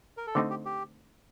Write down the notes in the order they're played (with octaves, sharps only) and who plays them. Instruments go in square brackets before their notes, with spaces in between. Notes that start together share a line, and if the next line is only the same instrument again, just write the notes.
[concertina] A#4
A4
[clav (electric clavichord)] D3 A3 C4 D#4 [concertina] G4
[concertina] G4
G4